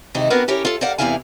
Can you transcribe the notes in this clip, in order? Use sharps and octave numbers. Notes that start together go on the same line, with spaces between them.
C3 D#3 E3 G#3 D#4 E4
B3 C4 D4 F#4 A#4 B4
C#4 E4 G4 A4 A#4 C#5
F4 A4
A#4 C5 D5 F5 F#5
E2 C3 E3 E4 F5 G#5